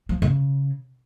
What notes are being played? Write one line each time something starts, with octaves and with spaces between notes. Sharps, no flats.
F3
C#3